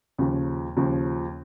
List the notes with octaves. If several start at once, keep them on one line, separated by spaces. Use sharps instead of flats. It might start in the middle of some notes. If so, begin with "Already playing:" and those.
D#2 C#3 F3
D#2 C#3 F3